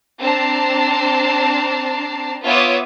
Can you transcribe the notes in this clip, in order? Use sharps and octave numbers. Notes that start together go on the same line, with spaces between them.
C4 D4 A5 A#5 C7
B3 F4 C#5 E5 D6 D#6